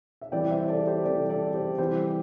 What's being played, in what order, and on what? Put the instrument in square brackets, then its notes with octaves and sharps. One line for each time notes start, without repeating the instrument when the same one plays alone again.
[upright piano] E5
C3 E3 G3 D5 G5
C5 E5
A4 D5
G4 C5
C3 E3 G3 A4 D5
A4 D5
G4 C5
C3 E3 G3 G4 C5